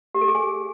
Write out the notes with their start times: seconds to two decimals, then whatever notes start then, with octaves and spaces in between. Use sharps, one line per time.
0.15 G4
0.21 A4
0.28 G#4
0.35 G#5